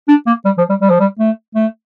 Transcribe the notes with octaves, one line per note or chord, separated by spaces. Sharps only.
D4
A#3
G3
F3
G3
G3
F3
G3
A3
A3